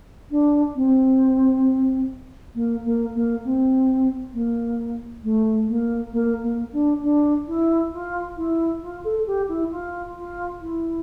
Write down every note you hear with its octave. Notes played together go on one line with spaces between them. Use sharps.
D4
C4
A#3
A#3
A#3
C4
A#3
A3
A#3
A#3
A#3
D4
D4
E4
F4
E4
F4
A4
G4
E4
F4
F4
E4